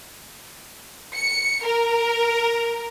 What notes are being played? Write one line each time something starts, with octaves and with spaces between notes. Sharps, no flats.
C#7
A#4